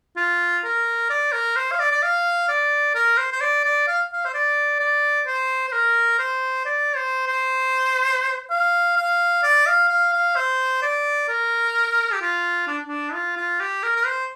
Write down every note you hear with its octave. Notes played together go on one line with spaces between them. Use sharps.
F4
A#4
D5
A#4
C5
F5
D5
D5
F5
D5
A#4
C5
C5
D5
D5
F5
F5
C5
D5
D5
C5
C5
A#4
C5
D5
C5
C5
F5
F5
D5
F5
F5
F5
C5
D5
A#4
G4
F4
D4
D4
F4
F4
G4
A#4
A#4
C5